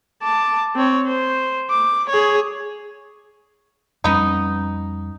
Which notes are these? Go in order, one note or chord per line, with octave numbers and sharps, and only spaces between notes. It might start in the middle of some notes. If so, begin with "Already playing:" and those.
A5 D6
C4 C#5
C5
D6
G#4 C#5
F2 G3 B3 C#4 D#4